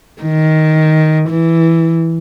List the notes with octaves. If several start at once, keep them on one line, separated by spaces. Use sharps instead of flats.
D#3
E3